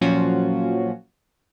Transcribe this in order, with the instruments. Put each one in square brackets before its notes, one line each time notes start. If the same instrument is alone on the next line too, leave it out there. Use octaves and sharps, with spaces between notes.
[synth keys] A#2 F3 F#3 C#4 F4 F#4